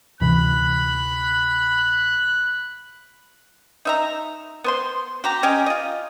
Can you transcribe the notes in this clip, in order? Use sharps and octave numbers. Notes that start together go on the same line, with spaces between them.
D2 C3 E3 B5 F#6
D#4 E5 A#5
B3 C5 C6
F#4 G4 A#5
C#4 G4 D#5 G#5
F4 D#5